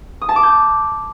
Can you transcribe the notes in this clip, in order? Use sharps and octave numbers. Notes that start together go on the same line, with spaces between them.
D#6
A5
D6
G6